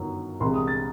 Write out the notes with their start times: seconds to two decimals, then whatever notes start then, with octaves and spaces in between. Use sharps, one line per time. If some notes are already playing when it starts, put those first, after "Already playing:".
Already playing: G1 F#2 D#3 F#3
0.40 C2 C3 E3 G#3 C6
0.54 D#6
0.67 A6